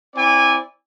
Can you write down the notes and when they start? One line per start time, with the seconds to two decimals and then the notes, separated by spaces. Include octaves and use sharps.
0.15 C4 E4 D5 G#5